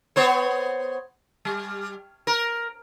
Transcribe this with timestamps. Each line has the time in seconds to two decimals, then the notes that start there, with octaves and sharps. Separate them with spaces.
0.16 B3 C5 C#5
1.45 G3
2.27 A#4